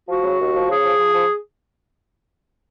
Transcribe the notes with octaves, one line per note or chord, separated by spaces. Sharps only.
F3 F#4
C#3
D#2
F3
C#3 G#4
F3
F3
F3